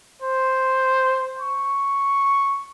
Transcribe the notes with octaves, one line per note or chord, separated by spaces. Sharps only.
C5
C#6